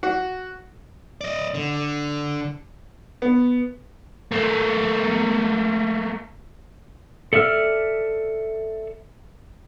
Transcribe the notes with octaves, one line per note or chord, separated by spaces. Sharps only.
F#4
D5 D#5
D3
B3
A3 A#3
A4 D5 E5 E6 F6